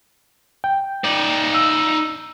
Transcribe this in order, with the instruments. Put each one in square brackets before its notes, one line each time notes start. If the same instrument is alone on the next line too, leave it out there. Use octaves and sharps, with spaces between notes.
[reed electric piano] G5
[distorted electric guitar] D#4 D5
[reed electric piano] E6